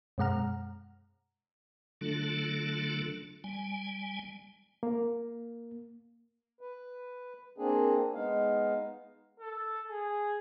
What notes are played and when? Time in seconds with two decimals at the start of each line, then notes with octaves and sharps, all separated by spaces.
0.18 F#2 B2 G#3 F#5 A#5 F6
2.01 D3 F#3 A3 D4 F4 A4
3.44 G3 G#5
4.83 A#3
6.61 B4
7.58 A#3 C4 D4 G#4
8.15 G#3 B3 D#4 F5
9.40 A4
9.88 G#4